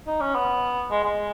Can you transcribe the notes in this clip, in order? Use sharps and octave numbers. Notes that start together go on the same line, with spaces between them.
D#4
C#4
B3
G#3
G#3